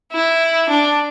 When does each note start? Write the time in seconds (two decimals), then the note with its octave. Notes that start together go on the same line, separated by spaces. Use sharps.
0.12 E4
0.69 D4